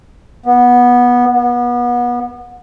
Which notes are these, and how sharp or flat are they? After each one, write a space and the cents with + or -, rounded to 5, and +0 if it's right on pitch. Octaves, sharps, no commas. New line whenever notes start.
B3 -15
B3 -30